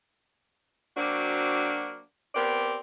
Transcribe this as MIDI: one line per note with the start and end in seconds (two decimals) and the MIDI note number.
0.97 2.01 54
0.97 2.01 58
0.97 2.01 60
0.97 2.01 62
0.97 2.01 66
2.35 2.79 59
2.35 2.79 60
2.35 2.79 67
2.35 2.79 70
2.35 2.79 74